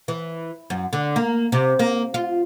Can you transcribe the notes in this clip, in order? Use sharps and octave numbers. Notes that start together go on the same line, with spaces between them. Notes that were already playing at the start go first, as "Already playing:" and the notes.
E3
F#2
D3
A#3
C3
A#3
F4